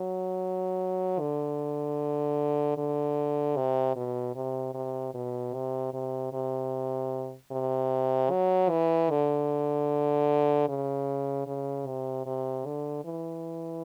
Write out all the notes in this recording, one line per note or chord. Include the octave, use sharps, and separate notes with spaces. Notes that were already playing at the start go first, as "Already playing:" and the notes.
Already playing: F#3
D3
D3
C3
B2
C3
C3
B2
C3
C3
C3
C3
F#3
E3
D3
C#3
C#3
C3
C3
D3
E3